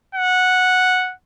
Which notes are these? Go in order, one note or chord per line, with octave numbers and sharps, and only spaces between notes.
F#5